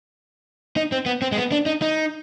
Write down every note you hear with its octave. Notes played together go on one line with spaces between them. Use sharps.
D#4
C4
B3
C4
G#3
B3
D4
D#4
D#4